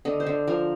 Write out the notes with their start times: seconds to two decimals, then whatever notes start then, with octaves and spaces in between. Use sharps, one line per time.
0.05 D3 D#5
0.20 C5
0.27 D3
0.48 F3 A#4